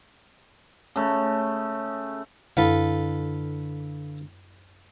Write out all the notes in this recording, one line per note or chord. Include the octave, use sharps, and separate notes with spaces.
C#3 A3
F#2 D3 A4 B4 F5